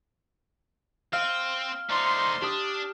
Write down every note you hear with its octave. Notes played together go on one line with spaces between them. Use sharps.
C4 F5 F6 D#7
A3 D#4 C5 D5 C6
D4 G4 D#6